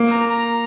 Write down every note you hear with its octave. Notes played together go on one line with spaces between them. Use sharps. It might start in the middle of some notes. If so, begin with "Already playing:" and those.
Already playing: A#3
A#5
A#5